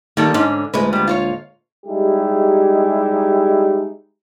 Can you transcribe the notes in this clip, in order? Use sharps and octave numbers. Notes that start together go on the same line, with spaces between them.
D#3 G3 A#3 A4
G#2 D3 C#4
D2 A#2 G#3 B4
G3 B3
F4 C5 C#5
G3 G#3 D#4 E4 G4 G#4